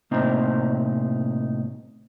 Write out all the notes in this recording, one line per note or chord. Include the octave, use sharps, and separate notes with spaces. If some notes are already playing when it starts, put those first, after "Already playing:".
A2 C3 A#3 C4 D#4